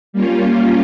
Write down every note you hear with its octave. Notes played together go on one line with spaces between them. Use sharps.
G3 A#3 C#4 F4